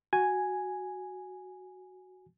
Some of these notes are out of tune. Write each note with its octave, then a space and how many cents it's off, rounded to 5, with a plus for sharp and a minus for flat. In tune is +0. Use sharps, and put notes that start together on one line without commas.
F#4 +0 G#5 +0